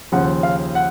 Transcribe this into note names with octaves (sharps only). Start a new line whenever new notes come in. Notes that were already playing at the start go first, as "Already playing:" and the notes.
D#2 C#3 F3 F#5
F5
F#5